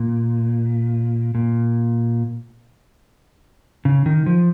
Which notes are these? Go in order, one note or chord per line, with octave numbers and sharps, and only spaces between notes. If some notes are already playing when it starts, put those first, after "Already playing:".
Already playing: A#2
A#2
C#3
D#3
F3